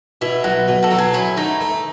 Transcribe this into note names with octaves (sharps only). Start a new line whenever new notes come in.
B2 E4
B1 F#4
B2
F#4 A4
F#3
G#4
C#4 E4
A3 D#4
A3